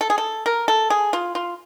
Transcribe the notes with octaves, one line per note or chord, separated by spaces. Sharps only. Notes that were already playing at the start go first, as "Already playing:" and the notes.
A4
G#4
A4
A#4
A4
G#4
F4
F4